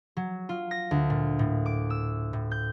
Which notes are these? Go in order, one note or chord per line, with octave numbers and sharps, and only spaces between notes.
F#3
F4
A#6
D2
A#2
A2
D6
E6
A2
G6